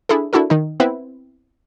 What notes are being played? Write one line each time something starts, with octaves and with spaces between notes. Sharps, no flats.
D4 E4 G#4 A4
D4 E4 F#4 A4 A#4
D#3 D#4
B3 C4 E4 B4